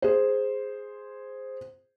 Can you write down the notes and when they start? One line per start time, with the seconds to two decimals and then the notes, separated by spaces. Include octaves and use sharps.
0.02 G#4 C5